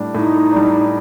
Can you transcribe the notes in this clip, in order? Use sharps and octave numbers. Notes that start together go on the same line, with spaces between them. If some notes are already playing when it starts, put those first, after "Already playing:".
Already playing: A2 G3 D4
A2 D#4
G3 D4